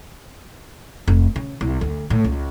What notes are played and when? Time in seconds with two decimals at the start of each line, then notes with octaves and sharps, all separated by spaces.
1.07 F1
1.36 C#3
1.61 C2
1.81 D2
2.10 A2
2.24 C#2